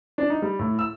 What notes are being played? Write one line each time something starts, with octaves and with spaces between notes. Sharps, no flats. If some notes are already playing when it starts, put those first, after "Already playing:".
D4
D#4
G3
A2
E6